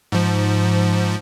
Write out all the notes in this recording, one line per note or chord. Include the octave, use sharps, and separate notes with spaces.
G#2 F3